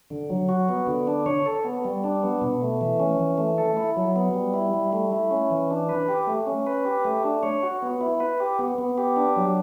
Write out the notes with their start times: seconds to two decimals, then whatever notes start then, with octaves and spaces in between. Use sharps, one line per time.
0.10 D3
0.30 F#3
0.49 F#4
0.69 B3
0.87 D3
1.07 D4
1.26 C#5
1.46 A4
1.65 B3
1.84 G3
2.04 D4
2.23 B3
2.41 B2
2.62 A3
2.81 E3
3.00 C#4
3.20 E3
3.38 A3
3.58 A4
3.77 E4
3.96 F#3
4.16 B3
4.34 G3
4.54 E4
4.73 G3
4.93 A3
5.12 E4
5.31 C#4
5.50 E3
5.70 D4
5.89 B4
6.08 G4
6.27 A3
6.47 C#4
6.67 B4
6.85 G4
7.05 A3
7.24 D4
7.43 C#5
7.63 F#4
7.82 B3
8.01 E4
8.20 B4
8.40 G4
8.59 B3
8.78 B3
8.98 G4
9.16 D4
9.36 F#3